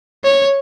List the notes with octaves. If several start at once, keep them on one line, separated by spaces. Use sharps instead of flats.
C#5